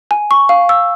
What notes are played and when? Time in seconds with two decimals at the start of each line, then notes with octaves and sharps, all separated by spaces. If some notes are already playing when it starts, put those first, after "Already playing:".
0.11 G#5
0.31 C#6
0.49 F5
0.69 E6